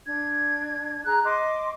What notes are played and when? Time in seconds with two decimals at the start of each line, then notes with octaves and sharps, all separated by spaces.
0.06 D4 G#6
1.05 G#4 A#5 F#6
1.24 D#5 C6 D6